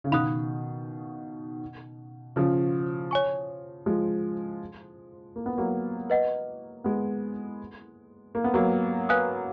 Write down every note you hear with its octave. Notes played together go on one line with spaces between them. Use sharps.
C#3
B2 D#3 F5 B5 D#6 F#6
C#3 F3
C#5 G#5 C#6
F3 G#3
A#3
B3
F#3 A#3
B4 D#5 F#5
G#3 B3
A#3
B3
F#3 A#3
B4 F5 G#5 D#6 F#6